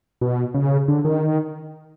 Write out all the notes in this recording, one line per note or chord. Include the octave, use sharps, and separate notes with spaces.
B2
C#3
D3
D#3